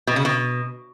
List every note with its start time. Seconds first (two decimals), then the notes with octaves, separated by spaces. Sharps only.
0.07 B2
0.16 C#3
0.25 B2